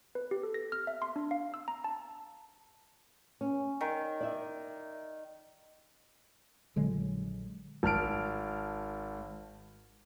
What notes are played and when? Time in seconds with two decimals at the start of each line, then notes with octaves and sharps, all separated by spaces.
0.15 B4
0.31 G4
0.43 A4
0.54 A#6
0.72 F6
0.87 E5
1.02 C6
1.16 D4
1.31 F5
1.54 E6
1.68 A#5
1.84 A5
3.41 C#4
3.81 D#3
4.21 D5 E5
6.76 A#1 D3 F#3 G#3
7.83 G#1 A5 F6 D7